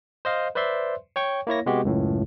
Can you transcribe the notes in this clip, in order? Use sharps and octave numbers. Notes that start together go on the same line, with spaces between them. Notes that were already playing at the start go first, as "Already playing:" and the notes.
C5 D#5 F5
B4 C5 D5 E5 C6
C#5 G5 C#6
A#3 E4 C#5 A#6
C3 G#3 B3 F#4 G4
C#2 F#2 A2